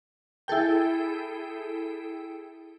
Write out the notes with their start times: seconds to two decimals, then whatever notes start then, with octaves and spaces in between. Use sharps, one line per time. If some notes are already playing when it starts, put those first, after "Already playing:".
0.48 E4 G#4 A4 G5